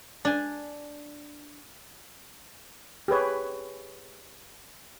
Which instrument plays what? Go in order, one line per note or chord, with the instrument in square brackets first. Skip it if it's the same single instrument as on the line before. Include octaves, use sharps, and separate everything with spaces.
[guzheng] D4 G#5
[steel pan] G4 G#4 B4 C#5